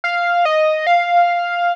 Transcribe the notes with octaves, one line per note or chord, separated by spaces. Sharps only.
F5
D#5
F5